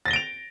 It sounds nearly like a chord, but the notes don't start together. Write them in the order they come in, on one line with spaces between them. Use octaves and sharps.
A6 A#6 G7 D7 F7